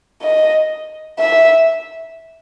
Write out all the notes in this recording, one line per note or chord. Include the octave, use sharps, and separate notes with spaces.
D#5
E5